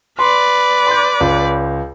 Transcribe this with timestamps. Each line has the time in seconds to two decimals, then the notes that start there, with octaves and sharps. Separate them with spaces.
0.19 B4 D5 C6
0.87 C6 D6 G6
1.20 C#2